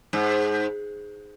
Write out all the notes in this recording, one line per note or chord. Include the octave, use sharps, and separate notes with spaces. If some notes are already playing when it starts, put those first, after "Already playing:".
G#2